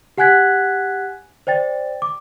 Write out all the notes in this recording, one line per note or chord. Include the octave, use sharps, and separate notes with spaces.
G4 F#5 G#5 F#6 G#6 B6
C5 D5 G5 A6
D6